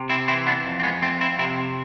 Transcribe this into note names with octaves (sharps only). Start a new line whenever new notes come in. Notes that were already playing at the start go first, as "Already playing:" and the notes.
Already playing: C3
C4 E4
E3 C4 E4
B3 D4
F2
C4
G#3 B3
F2 A3 C4
C4 E4
C3 C4 E4